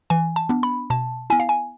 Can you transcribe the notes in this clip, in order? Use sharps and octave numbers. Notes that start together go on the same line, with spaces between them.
E3 G#5
A5
B3 D4
B5
B2 A5
B3 E4 G#5
F5
G#5